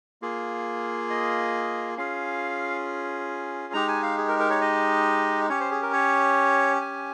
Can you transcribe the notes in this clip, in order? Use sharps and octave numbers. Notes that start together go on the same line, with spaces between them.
A#3 F4 G#4
D#5
C#4 F4 G#4 F5
G#3 D#4 G4 A#5
G#5
F5
G#4
A#4
A#4
C#5
D#5
C#4 G4 C#5
C5
G#4
A#4
C#5
G#5